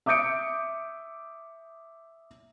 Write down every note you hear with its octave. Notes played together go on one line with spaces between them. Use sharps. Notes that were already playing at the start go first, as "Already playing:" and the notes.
E5 D6 D#6 G6 C#7 D7